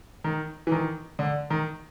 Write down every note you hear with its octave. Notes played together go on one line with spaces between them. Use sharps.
D#3
E3
D#3
D3
D#3